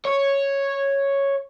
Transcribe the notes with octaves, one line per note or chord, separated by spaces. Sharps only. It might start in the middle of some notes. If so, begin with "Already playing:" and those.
C#5